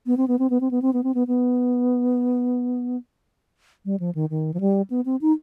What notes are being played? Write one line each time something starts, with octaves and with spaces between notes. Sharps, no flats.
B3
C4
B3
C4
B3
C4
B3
C4
B3
C4
B3
B3
G3
F3
D#3
D#3
F3
G3
B3
C4
D#4